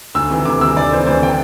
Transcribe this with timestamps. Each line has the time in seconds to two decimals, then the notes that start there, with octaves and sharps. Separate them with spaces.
0.15 D2 E6
0.30 C3 E3
0.45 D2 D6
0.61 C3 E3 E6
0.76 D2 D5
0.92 C3 E3 C5
1.06 D2 C5
1.22 C3 E3 G5